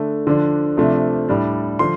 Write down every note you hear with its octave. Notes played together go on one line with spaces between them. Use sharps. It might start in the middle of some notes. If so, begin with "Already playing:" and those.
Already playing: D3 A3 D4
D3 F3 D4
C3 F3 A3 D4
A2 G3 D4
D3 F3 D4 C6